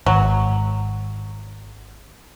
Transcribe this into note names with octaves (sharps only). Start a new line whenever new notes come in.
G#1 F#3